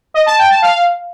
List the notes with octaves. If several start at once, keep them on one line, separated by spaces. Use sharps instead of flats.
D#5
A5
G5
A5
F5